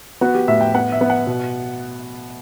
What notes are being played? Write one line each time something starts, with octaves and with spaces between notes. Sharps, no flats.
B3 F#4
G4
A2 E5
G5
B3 F#5
E5
B3
F#5
B2